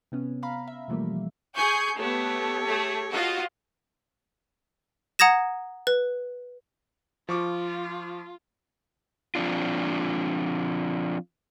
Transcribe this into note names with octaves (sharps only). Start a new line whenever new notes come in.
C3 B3 C#4
F5 A#5 B5
E5
B2 E3 F3 G3 A3 A#3
G#4 G#5 C#6 G6
A3 B3 G4 A4 C#5
A3 G#4
F4 F#4 D#5
F#5 A#5 D#6 G#6 A#6 E7
B4
F3 F4 C#6 D6
F3 C4 D4 F4